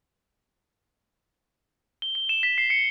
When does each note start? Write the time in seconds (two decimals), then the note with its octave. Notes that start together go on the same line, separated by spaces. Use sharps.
2.02 G7
2.15 G7
2.29 E7
2.43 B6
2.58 C7
2.70 C#7